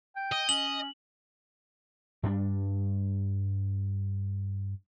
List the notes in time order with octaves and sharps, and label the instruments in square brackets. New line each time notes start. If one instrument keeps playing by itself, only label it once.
[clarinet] G5
[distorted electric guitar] D#5
[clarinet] C#4 [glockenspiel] F#7
[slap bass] G2 G3 D4